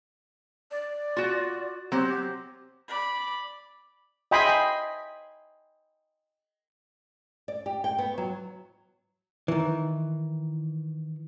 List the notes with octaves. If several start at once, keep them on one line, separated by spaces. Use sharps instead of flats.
D5
F4 F#4
F#3 C4 G4
D5 B5
D#5 E5 G5 G#5 B5 C6
D5
G4
G5
B3
F#3
D#3 E3